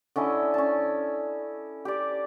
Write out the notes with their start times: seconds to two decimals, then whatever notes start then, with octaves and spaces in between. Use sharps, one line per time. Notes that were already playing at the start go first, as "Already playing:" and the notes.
0.16 D3 C#4 E4 D#5
0.54 C#4 A5
1.85 G4 D5